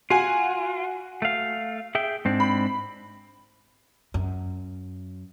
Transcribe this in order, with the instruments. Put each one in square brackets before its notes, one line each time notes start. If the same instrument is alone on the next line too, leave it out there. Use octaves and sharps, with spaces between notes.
[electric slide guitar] F4 [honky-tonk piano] F#4 G#5
[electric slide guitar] A3 F5
G#4 E5 G5
G#2 C4 D4
[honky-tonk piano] B5
[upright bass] F#2